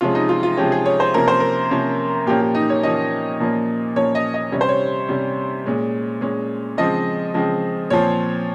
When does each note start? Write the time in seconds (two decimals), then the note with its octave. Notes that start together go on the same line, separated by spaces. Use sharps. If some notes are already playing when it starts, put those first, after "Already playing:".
0.01 C3 F3 G#3 C#4 F4
0.15 D#4
0.29 F4
0.43 F4
0.57 C3 F3 G#3 C#4 G4
0.72 G#4
0.86 C#5
1.00 C5
1.14 C3 F3 A#3 C#4 A#4
1.28 C5
1.40 A#4
1.71 C3 F3 A#3 C#4
2.26 A#2 F3 A#3 C#4 G4
2.41 G4
2.55 D#4
2.70 C#5
2.83 A#2 F3 A#3 C#4 D#5
3.40 A#2 F3 A#3 C#4
3.96 A#2 F3 A#3 C#4 C#5
4.15 D#5
4.34 D#5
4.52 C3 G3 C#4 C#5
4.61 C5
4.69 C#5
5.09 C3 G3 C#4
5.66 A#2 G#3 C#4
6.21 A#2 G#3 C#4
6.77 C#3 F3 G#3 C4 D#5
7.34 C#3 F3 G#3 C4
7.90 A#2 F3 C4 C#5